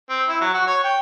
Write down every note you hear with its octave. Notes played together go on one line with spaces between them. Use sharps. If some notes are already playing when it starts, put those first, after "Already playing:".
C4
E4
F#3
F#4
C#5
G5